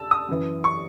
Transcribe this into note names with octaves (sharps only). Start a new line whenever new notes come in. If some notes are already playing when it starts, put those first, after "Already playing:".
Already playing: A5 E6
D#6
F#2 E3
C#6